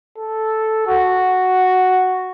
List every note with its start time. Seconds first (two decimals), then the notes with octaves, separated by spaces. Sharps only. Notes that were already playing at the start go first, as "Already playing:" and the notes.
0.18 A4
0.87 F#4